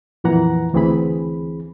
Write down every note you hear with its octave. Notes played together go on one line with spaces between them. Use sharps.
F2 A#2 E3 F#5 A#5
D2 E3 C4 G#4 B5